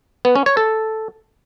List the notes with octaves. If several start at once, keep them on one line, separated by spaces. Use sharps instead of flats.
B3
C#4
C#5
A4